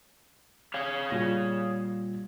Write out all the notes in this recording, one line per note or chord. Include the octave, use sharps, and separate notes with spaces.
G#4 C#5 F5
A#2 G3 A#6